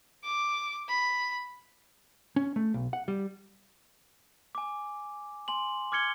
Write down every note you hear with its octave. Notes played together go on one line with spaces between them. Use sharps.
D6
B5
C#4
A3
B1
F#5
G3
G#5 D6
G#5 C6 F#7
D6 F6 G#6 C#7 G7